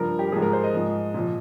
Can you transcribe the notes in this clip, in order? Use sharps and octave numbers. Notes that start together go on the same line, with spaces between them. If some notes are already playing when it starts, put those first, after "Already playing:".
Already playing: G2 F3 A#4
G4
G#2 F3 G#4
A#4
C5
D#5
G#2 F3
A#2 F3